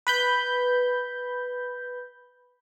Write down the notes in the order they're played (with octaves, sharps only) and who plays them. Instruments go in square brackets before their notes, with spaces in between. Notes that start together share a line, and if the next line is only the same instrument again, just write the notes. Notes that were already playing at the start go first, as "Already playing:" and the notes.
[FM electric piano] B4 B5 G6